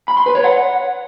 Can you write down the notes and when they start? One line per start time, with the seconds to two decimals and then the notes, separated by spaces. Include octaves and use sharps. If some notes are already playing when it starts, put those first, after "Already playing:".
0.08 B5
0.17 C6
0.26 B4
0.35 C#5
0.44 F#5